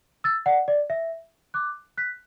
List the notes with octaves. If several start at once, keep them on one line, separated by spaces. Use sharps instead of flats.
E6 A6
D5 F#5
D5
E5
D6 F#6
F#6 B6